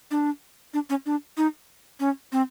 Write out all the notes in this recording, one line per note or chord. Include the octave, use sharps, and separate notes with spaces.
D4
D4
C#4
D4
D#4
C#4
C4